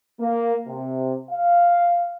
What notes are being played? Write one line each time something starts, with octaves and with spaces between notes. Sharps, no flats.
A#3
C3
F5